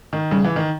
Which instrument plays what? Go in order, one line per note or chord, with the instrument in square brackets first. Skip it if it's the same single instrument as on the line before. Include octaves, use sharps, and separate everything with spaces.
[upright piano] D#3
[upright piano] C#3 [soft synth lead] G3
[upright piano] E3
D#3